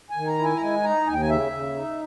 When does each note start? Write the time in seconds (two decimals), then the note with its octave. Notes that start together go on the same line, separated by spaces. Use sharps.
0.10 G#5
0.16 D#3
0.27 A#5
0.38 E4
0.44 G#5
0.57 A#5
0.61 G#3 G#5
0.84 D#4 A#5
1.07 D#2 G#5
1.14 G5
1.22 G#5
1.30 C#3 E5
1.52 C#3
1.75 D#4